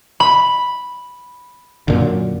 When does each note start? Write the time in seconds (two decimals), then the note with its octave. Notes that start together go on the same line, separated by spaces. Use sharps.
0.20 B5
1.88 F#2 A#2 D3